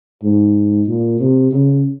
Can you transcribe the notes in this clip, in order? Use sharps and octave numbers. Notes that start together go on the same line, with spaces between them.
G#2
A#2
C3
C#3